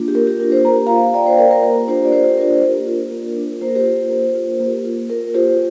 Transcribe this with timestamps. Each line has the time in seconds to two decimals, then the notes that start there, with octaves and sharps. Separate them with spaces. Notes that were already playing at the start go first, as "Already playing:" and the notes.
Already playing: A#3 D4 F4
0.08 G4
0.15 A#3 A#4
0.27 G4
0.40 D4 A#4
0.43 F4
0.52 G4 C5
0.65 A#3 A#5
0.86 F4 F5 A#5
1.14 A#3 D5 G5
1.26 C5 F5
1.38 F4 A#4 D5
1.51 A#4
1.63 A#3 A#4
1.88 D4 F4 G4 C5
2.05 D5
2.12 A#3 G4 C5
2.38 D4 F4 A#4
2.62 A#3
2.87 D4 F4
3.11 A#3
3.37 D4 F4
3.61 A#3 C5
3.68 A#4
3.75 G4 C5
3.86 F4
4.11 A#3
4.35 F4
4.60 A#3
4.85 F4
5.10 A#3 A#4
5.34 F4 G4 C5